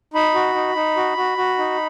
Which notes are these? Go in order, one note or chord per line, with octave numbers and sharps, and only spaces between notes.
D#4 B5
F#4
D#4
D#4
F#4
F#4
F#4
D#4